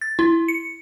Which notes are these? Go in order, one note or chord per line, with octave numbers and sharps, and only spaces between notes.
A6
E4
C#7